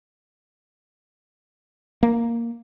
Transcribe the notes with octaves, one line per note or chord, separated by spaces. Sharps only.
A#3